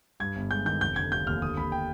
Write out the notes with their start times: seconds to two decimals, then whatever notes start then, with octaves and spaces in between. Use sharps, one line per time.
0.20 G2 G#6
0.36 G1
0.51 G#3 G6
0.66 D#3 G6
0.81 F1 G6
0.96 D3 G#6
1.11 F1 G6
1.27 D#2 F6
1.42 D3 D#6
1.57 D#2 B5
1.72 G5